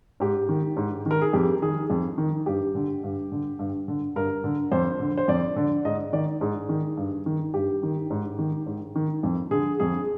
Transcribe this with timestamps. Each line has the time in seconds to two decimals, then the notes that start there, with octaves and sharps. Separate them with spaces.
0.20 G#2 G4
0.49 D#3
0.76 G#2
1.06 D#3 A#4
1.22 G#4
1.33 F2 G4
1.62 D#3 G#4
1.90 F2
2.18 D#3
2.46 G2 G4
2.75 D3
3.03 G2
3.32 D3
3.59 G2
3.88 D3
4.16 G2 A#4
4.44 D3
4.72 F2 C5
5.00 D3
5.18 C5
5.28 F2 D5
5.56 D3
5.85 G#2 D#5
6.13 D#3 D5
6.41 G#2 G#4
6.69 D#3
6.97 G2
7.26 D#3
7.54 G2 G4
7.83 D#3
8.10 G#2
8.39 D#3
8.66 G#2
8.95 D#3
9.23 F2
9.51 D3 G#4
9.80 F2 G#4